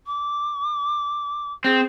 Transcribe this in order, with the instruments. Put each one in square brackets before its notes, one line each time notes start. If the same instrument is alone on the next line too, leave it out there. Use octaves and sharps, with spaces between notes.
[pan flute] D6
[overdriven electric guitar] C4 [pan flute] G#4